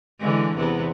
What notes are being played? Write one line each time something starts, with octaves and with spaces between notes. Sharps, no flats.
D3 E3 G#3
E2 C3 B3